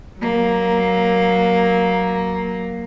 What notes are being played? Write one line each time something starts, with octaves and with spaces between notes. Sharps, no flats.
F#3 A#3